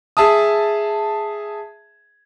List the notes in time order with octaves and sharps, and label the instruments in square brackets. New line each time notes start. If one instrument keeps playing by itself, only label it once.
[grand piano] G#4 E5 A5 D#6